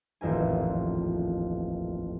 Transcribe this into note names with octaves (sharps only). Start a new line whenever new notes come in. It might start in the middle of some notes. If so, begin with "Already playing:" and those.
D#1 A1 F2 A#4 G#5